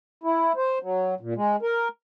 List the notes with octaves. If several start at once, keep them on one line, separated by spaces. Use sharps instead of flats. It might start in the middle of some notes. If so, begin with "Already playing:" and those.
E4
C5
F#3
A#2
G#3
A#4